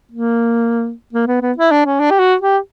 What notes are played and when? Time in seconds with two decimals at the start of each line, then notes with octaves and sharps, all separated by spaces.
0.12 A#3
1.13 A#3
1.27 B3
1.42 B3
1.58 E4
1.71 D4
1.86 C#4
2.00 D4
2.11 G4
2.19 F#4
2.42 G4